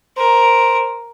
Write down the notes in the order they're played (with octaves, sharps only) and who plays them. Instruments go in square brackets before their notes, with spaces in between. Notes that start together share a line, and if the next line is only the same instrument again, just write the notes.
[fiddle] A#4 [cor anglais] C5